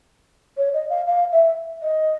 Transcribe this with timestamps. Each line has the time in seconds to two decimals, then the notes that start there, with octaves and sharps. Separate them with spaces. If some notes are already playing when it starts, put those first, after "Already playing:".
0.58 C#5
0.74 D#5
0.90 F5
1.07 F5
1.32 E5
1.82 D#5